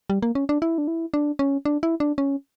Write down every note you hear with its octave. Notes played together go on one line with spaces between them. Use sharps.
G3
A#3
C#4
D4
E4
D4
E4
D4
C#4
D4
E4
D4
C#4